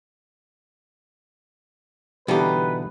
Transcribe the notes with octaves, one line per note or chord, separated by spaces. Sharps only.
B2 D3 E3 G3 D#4 G4 B4